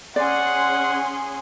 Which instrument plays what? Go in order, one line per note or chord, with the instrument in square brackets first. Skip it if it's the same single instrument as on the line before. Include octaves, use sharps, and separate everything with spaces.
[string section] C#4 G#4 C6 [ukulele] D5 [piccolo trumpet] F#5